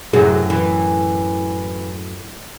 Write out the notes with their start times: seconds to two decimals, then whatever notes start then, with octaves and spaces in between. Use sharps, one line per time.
0.13 F#2 A2 C3 F#3 F#4 G#4
0.50 E3